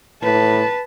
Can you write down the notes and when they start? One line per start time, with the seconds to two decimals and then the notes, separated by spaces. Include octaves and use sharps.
0.23 A2 B4 A5